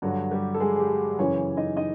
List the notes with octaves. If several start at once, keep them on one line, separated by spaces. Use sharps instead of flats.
G2 D3 F#3 F#4
G3 G4
A4
G#3 G#4
G#4
G3 G4
F#2 C#3 E3 C#4 C#5
D#4 D#5
D#4 D#5